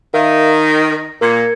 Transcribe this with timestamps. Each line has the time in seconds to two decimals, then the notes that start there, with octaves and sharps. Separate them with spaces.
0.14 D#3 A#4 E5 F5
0.64 A#6
1.21 A#2 A#3 A#4 G#6 C#7